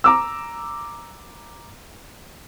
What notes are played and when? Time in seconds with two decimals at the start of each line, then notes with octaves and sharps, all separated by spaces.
0.04 A#5 D6 E6